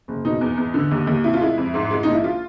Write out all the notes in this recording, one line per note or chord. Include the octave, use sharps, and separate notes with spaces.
F#1
B2 D#4
E2
E2
D3
D#2
D#2
C3 E4
F4
G#3 E4
F2
G#2
G#3
A#1 D#4
E4
F4